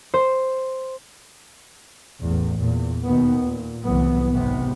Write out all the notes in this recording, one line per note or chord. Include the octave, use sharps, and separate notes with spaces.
C5
A1 E2
E2 A#2
D#2 B2 D#3 B3
A#2
C2 A2 E3 F#3 B3
G#1 G#2 C3 B3